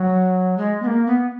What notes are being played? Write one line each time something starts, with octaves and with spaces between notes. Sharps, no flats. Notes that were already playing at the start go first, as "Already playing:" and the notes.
Already playing: F#3
G#3
B3
A#3
B3